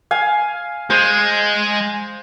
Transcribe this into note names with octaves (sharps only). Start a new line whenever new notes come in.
F5 G#5
G#3 C5